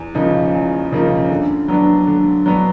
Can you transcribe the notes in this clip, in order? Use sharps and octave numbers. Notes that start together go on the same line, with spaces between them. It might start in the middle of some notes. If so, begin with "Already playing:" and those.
Already playing: E2
C#3 F3 A#3 D#4
E2
C#3 F3 A#3 D#4
D3
F#3 B3 D4
D3
F#3 B3 D4